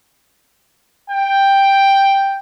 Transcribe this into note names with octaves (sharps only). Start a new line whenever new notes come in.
G5